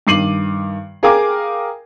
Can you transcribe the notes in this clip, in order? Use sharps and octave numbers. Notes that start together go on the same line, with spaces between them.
G2 D#3 D6 C7 D#7 F#7
G#4 A#4 F5 G5 G#5 D6